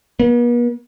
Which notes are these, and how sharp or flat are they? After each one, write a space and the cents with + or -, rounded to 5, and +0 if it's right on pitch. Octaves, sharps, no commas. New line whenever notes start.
B3 -45